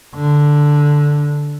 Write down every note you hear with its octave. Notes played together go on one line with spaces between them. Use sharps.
D3